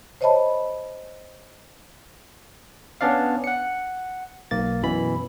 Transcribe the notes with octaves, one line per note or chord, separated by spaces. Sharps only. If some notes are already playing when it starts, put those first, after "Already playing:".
C5 C#5 D#5 E5 A5 B5
B3 C#4 D4 D5 F5
F#5 C#7
B1 A#3 A6
F#2 B2 E3 B5